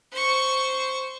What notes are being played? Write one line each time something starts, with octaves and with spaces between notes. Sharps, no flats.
C5 C#6